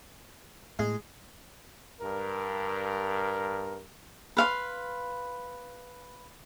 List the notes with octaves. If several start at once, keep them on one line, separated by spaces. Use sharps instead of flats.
A2 G#3
G2 A#4
B4 F5 C6